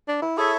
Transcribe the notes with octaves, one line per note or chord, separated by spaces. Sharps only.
D4
E4
E4 G#4 A4 C#5 E5